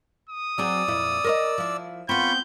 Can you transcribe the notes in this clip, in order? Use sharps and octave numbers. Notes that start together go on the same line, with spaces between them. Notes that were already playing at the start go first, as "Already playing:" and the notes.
D#6
F#3 C4 G#4 D5 E6
F2 A#2 E4
A#4 C5 D#5
F3 E4
B3 C4 F4 B5 C#6 G6